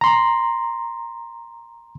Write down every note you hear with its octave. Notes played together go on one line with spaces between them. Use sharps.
A#5 C6